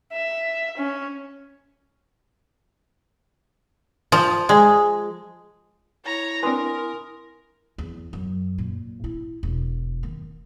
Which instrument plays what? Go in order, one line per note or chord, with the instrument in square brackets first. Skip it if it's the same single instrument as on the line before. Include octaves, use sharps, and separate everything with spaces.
[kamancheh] E5
C#4
[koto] F3
G#3
[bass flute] E4 [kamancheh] C#5 A#5
[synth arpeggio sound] C4 D4 B4 [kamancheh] A#4 [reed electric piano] G#5 C6 D#6
[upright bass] E2
F#2
A#2
E4
E1
D#3